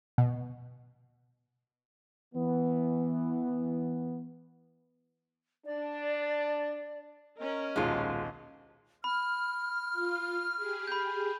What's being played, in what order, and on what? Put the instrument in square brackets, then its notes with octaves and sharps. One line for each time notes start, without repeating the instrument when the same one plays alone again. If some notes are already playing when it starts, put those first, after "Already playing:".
[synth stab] B2
[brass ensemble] E3 B3
[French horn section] D4 [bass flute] D5
[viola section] C#4 A#4 [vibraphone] D#5
[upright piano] D#1 B1 [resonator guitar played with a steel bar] G#3 F4
[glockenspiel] B5 [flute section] F6
[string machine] F4
G4 G#4
[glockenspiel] B5 G6